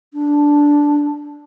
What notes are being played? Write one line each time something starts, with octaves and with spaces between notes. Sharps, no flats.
D4